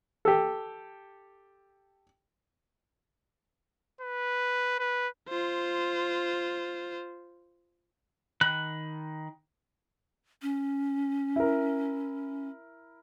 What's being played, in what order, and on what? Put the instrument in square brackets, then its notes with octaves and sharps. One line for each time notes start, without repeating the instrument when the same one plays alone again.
[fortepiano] G4 A4
[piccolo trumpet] B4
B4
[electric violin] F4 C5
[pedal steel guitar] D#3 B5 F#6
[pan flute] C#4
[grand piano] E4 A#4